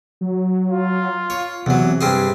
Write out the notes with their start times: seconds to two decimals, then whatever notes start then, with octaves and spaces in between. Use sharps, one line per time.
0.21 F#3
0.70 F4
1.30 C#5
1.66 E2 C3 F#3
2.01 G2 C4 G#4